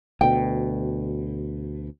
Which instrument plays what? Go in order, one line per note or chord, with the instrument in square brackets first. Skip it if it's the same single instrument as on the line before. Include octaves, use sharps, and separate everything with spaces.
[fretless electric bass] D2 B2 [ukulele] G5